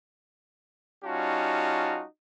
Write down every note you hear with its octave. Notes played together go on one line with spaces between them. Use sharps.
G3 C#4 D#4 F4 F#4 A5